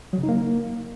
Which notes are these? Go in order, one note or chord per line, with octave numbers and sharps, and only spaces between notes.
F#3
C#3
D#4
A#3